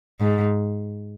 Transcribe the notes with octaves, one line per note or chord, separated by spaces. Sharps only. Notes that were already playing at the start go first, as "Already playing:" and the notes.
G#2